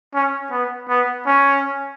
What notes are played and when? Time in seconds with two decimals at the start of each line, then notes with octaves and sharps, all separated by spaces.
0.14 C#4
0.51 B3
0.89 B3
1.26 C#4